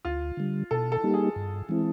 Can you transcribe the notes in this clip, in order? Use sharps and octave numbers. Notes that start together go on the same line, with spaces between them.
D2 F4
D3 G3
B2 A4
A4
G3 A#3 D#4 G4
G#4
G2
E3 G#3 C4 E4